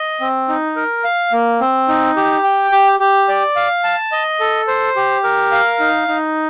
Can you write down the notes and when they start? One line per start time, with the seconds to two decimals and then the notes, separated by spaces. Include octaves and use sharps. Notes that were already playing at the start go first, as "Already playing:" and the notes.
Already playing: D#5
0.20 C4
0.48 D#4
0.76 A#4
1.04 F5
1.32 A#3
1.60 C4
1.88 D#4
2.16 G4
2.44 G5
2.72 G4
3.00 G4
3.28 D5
3.56 F5
3.84 A5
4.12 D#5
4.40 A4
4.68 C5
4.96 G4
5.24 A#4
5.52 F5
5.80 D#4
6.08 D#4